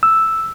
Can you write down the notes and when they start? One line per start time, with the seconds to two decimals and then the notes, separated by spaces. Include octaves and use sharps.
0.03 E6